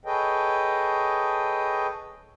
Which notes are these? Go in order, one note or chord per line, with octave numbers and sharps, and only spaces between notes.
G#4 A4 B4 C#5 D#5 G5